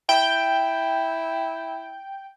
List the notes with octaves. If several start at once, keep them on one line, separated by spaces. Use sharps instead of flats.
E4 G5